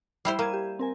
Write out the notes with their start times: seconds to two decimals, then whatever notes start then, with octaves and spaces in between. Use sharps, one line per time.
0.25 G3 E4 C5 C7
0.39 A#3 G#6 D#7 E7
0.53 G4
0.79 C4 A#4 G#5